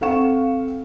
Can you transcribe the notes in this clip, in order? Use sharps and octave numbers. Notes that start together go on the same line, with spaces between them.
C4 A4 F5 F#5 C#6 E7